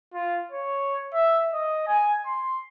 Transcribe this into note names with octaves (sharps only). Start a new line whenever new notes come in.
F4
C#5
E5
D#5
G#5
C6